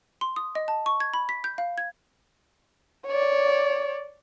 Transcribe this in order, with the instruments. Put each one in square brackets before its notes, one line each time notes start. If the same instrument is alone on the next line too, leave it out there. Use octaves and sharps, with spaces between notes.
[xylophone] C6
D#6
D#5
A5
C#6
G#6
B5
B6
G6
F5
G#6
[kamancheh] C#5 D5